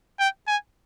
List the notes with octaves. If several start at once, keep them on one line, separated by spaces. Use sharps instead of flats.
G5
G#5